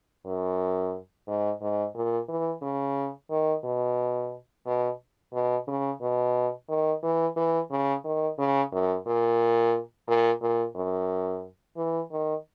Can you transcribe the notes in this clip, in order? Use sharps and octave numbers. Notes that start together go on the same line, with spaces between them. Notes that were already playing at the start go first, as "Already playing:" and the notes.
F#2
G#2
G#2
A#2
E3
C#3
D#3
B2
B2
B2
C#3
B2
D#3
E3
E3
C#3
D#3
C#3
F#2
A#2
A#2
A#2
F#2
E3
D#3